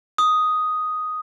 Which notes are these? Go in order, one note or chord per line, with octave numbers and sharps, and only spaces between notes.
D#6